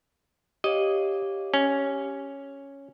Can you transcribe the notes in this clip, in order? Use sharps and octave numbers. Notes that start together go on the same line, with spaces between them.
G4 C#5 D#5 F5
C#4